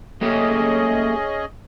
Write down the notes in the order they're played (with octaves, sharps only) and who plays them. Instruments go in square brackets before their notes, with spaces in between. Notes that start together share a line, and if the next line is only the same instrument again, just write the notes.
[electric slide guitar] A3 A#3 G4 [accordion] C#4 G#4 D#5